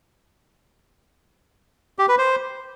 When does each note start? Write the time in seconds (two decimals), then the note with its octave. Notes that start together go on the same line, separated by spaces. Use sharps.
1.99 G4
2.08 B4
2.18 C5